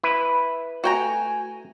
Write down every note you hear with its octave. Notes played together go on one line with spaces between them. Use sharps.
E4 B4
A3 F#4 G5 G#5 A#5